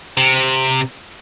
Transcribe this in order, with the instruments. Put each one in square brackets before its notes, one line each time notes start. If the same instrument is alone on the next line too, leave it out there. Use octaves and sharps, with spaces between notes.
[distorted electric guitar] C3